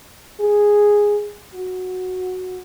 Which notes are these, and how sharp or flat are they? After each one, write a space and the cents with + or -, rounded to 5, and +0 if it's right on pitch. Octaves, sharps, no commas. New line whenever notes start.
G#4 -5
F#4 -5